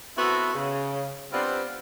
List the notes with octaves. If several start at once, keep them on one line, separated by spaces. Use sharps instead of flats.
B3 C4 E4 F#4 A4 F#5
C#3
G3 B3 C4 D4 F4 C5